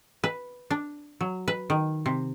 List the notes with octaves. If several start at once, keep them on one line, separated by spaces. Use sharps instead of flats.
B4
D4
F#3
B4
D#3
C3